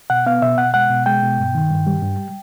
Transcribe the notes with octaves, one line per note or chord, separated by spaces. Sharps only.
B2 F#5
B3 F5
B2 E5
B2 F#5
G#3 F#5
B2
G#3 G5
B2
G2
D#3
G2
G3
G2